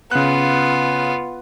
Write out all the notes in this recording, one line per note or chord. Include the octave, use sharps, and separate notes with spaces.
C#3 B3 F4 F#6